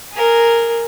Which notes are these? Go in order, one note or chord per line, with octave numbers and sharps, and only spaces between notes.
G#4 A#4